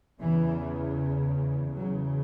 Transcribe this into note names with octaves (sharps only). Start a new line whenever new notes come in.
E2 C#3 E3
E2 C#3 F#3